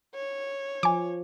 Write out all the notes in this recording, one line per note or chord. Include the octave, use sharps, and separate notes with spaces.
C#5
F3 G#5 D6